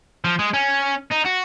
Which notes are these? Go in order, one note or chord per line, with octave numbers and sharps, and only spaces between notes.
F3
G#3
C#4
D#4
F#4